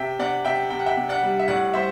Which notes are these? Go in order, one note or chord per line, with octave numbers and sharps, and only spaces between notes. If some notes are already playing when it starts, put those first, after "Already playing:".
Already playing: C3 E5 G5
C3 D5 F#5
C3 E5 G5
C3 G5
F#5
E5 G5
C3
D5 F#5
G3
E5
A2 D5 F#5
G3 C5 E5